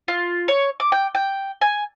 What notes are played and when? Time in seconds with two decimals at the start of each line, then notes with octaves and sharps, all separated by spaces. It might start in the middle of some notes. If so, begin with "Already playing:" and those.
0.08 F4
0.48 C#5
0.80 D6
0.92 G5
1.15 G5
1.61 G#5